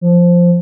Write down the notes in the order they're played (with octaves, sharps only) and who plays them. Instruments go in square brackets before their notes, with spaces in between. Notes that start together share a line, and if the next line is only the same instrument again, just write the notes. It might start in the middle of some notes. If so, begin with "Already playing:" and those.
[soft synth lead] F3